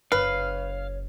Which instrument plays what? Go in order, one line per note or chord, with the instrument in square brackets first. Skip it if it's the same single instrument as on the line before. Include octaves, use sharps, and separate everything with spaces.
[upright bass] F#1 [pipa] B4 [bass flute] C#5 [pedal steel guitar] F5